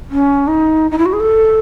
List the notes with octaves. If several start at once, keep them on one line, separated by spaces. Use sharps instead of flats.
C#4
D#4
D#4
E4
F#4
G#4
A4